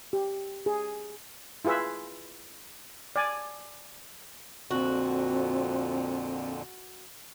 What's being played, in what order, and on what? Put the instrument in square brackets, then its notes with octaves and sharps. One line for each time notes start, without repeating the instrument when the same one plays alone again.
[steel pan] G4
G#4
E4 F4 G#4 B4 E5
D5 G#5
[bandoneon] F2 A#2 D3 [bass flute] C4 [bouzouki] F#4